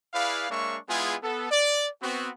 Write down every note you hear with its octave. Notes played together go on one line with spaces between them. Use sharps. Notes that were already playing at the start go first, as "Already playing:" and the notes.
E4 G#4 B4 D5 F5
G#3 A#3 D4 C#5 E5 C#6
G#3 B3 E4 F4 G#4
B3 A4
D5
B3 C4 F#4